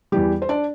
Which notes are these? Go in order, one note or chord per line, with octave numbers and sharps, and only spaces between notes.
E2 E3 G3 G4
C5
D4 D5